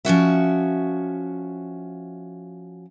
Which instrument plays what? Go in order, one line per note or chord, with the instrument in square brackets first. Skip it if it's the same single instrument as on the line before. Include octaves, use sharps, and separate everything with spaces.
[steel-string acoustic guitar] F3 C#4 F#4 E5